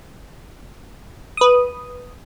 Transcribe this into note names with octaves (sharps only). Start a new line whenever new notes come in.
B4 D#6